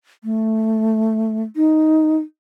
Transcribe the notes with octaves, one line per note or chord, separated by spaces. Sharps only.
A3
D#4